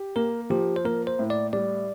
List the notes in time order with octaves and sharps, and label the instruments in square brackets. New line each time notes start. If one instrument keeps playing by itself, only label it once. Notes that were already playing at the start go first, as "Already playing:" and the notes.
Already playing: [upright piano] G4
[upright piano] A#3 [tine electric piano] A#4
[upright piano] F3 [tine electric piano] G4
[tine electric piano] C5
[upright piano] A#3 [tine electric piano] A#4
[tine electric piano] C5
[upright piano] A2
[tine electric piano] D5
[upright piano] G3 [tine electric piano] D5